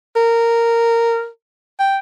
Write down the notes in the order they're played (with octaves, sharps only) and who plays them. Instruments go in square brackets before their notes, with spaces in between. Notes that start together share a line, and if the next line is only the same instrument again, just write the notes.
[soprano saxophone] A#4
G5